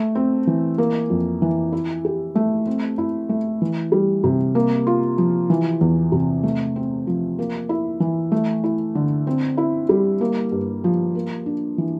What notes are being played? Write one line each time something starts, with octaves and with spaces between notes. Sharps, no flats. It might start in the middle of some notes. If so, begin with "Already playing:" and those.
Already playing: A3
C4
E3
A#3
F2
E3
E4
G4
A3
C4
E4
A3
E3
G3
C3
A#3
F4
F3
E3
E2
C3
A3
C4
F3
A#3
E4
E3
A3
E4
D3
C4
E4
G3
A#3
G2
F3
A#3
D4
E3